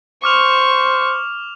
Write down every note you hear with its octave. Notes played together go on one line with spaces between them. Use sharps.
C5 C#6 D6 F6 F7